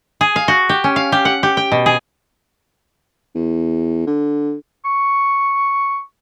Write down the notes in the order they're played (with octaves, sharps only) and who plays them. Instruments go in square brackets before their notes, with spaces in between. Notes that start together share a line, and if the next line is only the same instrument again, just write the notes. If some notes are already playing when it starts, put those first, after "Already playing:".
[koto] G#4
F5
F#4
G4
C#4
F5
G4
F#5
G4
G5
B2
G#4
[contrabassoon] E2
D3
[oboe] C#6